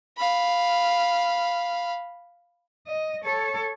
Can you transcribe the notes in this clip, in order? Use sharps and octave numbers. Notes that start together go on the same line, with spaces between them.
F5 B5
D#5
A4 C#5